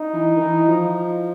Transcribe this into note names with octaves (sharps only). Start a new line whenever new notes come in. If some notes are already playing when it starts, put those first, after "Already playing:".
Already playing: D#4
E3
D#3
E3
F3